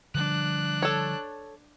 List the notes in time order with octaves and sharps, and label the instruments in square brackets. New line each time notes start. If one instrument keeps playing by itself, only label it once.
[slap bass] D3 F3 G3 [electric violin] D4 F#6
[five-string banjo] A4 C#5